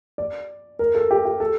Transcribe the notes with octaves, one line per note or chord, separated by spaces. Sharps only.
D5
A#4
A4
G4
G4
A4